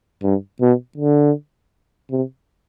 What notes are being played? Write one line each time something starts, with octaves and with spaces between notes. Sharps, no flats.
G2
B2
D3
C3